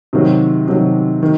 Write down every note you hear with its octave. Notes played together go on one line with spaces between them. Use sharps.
C3 D#3 F#3
C3 D#3 F#3
D#3